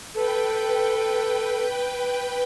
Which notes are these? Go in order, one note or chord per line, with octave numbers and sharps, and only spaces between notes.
A4 B4 G5